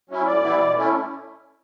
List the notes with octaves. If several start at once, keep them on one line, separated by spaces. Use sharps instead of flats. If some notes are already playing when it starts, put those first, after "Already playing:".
F#3 C#4 E4
A2 D5
E3 G3 B3 E4
B2
A3 C#4 E4